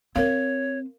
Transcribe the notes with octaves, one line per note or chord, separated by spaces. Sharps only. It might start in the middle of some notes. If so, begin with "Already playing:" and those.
C4 A#4 C#5 F5